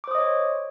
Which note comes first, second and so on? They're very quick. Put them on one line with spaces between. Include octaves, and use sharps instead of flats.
D6 C5 D#6 D#5 C#5